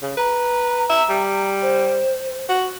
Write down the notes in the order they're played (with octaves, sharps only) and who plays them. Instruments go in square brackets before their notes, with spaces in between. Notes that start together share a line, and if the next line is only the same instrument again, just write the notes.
[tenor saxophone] C#3
[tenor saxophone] B4 [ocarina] A#5
[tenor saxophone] E5
G3
[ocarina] C5
[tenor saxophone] F#4